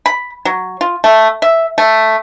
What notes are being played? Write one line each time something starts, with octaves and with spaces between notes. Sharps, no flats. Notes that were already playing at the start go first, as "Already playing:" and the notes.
B5
F#3
F4
A3
E5
A3